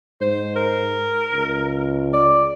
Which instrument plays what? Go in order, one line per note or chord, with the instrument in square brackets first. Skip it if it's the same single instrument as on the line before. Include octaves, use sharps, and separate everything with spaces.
[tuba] G#2 [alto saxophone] C5
[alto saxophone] A#4
[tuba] C#2
[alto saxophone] D5